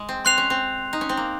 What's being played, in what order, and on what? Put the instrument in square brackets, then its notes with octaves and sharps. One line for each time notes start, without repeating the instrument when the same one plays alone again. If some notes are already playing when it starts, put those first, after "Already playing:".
Already playing: [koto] G#3
C4
[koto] C4 [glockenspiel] C6 F#6 C7 F7
[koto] C#4
C4
D#4
C#4
C4
A#3